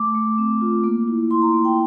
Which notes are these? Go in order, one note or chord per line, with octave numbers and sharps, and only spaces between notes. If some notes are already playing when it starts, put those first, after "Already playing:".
Already playing: A3 D6
A3
C4
F4
A#3
E4
E4 C6
A#5
A#3
G5